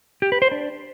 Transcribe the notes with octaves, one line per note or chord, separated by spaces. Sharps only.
G4
B4
C5
D4